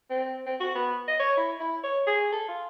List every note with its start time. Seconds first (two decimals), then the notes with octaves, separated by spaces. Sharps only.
0.10 C4
0.46 C4
0.60 F#4
0.75 B3
1.08 D#5
1.20 C#5
1.37 E4
1.60 E4
1.84 C#5
2.07 G#4
2.32 A4
2.48 F4